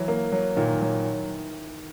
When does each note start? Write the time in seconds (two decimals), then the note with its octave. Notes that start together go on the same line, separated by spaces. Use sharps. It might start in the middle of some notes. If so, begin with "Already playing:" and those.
Already playing: E3 F#3
0.08 A#3
0.32 F#3
0.56 A#2 D#3
0.81 F#3